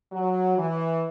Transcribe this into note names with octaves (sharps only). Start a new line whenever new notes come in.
F#3
E3